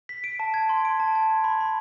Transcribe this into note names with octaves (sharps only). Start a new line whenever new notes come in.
B6
D7
A5
G#6
C6
D7
A5
G#6
C6
B5
B5